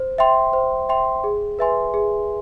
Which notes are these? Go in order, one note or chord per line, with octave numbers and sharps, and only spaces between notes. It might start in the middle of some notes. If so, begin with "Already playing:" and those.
Already playing: C5
E5 G5 C6
C5
E5 G5 C6
G#4
B4 E5 G#5 C6
G#4